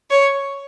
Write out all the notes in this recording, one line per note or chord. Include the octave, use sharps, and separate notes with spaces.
C#5